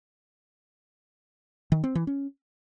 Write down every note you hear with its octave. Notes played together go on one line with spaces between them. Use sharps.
D#3
C4
E3
C#4